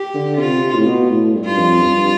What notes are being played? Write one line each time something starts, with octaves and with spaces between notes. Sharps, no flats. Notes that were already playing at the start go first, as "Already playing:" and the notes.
Already playing: G4
D3
C3 F4
C3
A2
B2
A2
G2
F4
F2
G2